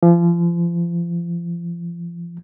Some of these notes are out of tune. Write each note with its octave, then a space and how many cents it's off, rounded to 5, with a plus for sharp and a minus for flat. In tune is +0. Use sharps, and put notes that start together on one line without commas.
F3 -35